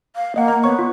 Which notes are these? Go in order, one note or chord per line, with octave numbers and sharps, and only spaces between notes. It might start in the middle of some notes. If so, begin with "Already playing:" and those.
F5
A#3 D#5 F#5
A#5
B3 C#5 C#6
F4